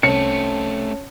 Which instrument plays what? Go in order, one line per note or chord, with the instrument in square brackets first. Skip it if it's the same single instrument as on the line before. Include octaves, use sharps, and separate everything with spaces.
[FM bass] C2 [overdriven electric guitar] A3 C4 [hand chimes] C#4 C#5 A5 [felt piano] C#7